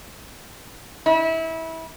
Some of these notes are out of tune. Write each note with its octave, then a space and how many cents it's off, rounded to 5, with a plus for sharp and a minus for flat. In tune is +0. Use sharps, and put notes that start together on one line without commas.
E4 -25